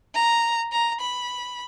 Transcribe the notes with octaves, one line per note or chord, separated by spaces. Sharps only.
A#5
A#5
B5